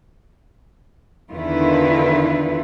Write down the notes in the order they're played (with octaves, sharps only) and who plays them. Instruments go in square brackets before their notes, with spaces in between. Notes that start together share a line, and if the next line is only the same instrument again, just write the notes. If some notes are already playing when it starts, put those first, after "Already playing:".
[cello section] E2 D3 D#3 E4 F4 B4